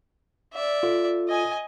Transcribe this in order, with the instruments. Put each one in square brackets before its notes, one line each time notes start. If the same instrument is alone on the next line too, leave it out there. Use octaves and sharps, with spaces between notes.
[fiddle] D5 E5
[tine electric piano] F4 A4
[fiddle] D#5 G#5